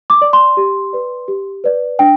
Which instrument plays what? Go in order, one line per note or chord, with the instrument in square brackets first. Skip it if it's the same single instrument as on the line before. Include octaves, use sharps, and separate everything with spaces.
[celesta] D6
D5
C6
G4
B4 D5
G4
B4 D5
D4 G5